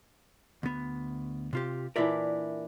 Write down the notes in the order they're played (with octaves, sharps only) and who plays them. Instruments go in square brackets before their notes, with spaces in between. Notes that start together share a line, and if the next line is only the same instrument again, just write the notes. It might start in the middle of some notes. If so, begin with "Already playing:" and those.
[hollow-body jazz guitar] D2 B3
C3 F4 G4
[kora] A#2 E3 D4 [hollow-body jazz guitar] A#4 D5 E5